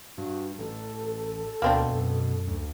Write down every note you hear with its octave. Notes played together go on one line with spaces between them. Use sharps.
G2 F#4
A1 A4
D2 B2 A#3 C4 D4
F#2
D2